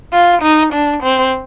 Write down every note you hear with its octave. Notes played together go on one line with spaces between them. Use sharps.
F4
D#4
D4
C4